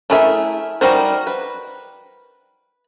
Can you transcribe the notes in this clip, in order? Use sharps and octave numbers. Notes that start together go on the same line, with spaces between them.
A3 E4 G#4 A#4 E5
G3 D#4 F#4 A#4 C5
B4